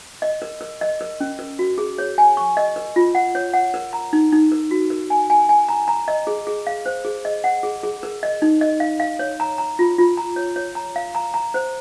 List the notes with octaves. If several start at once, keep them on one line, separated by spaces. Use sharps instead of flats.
D#5
A#4
A#4
D#5
A#4
C#4
A#4
F#4
G#4
C#5
G#5
C#6
D#5
A#4
F4
F#5
C#5
F#5
A#4
A#5
D#4
D#4
A#4
F#4
A#4
G#5
G#5
G#5
A#5
A#5
D#5
G#4
G#4
F5
C5
G#4
D#5
F#5
G#4
G#4
A#4
D#5
D#4
D#5
F5
F5
C#5
A#5
A#5
F4
F4
A#5
C#5
C#5
A#5
F5
A#5
A#5
C5